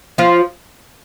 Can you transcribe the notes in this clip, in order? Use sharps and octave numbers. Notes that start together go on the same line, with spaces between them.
F3 F4